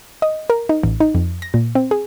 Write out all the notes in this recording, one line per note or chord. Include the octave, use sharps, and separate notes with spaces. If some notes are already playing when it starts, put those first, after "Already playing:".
D#5
A#4
D#4
A1
D#4
F2
A#6
A#2
C4
G#4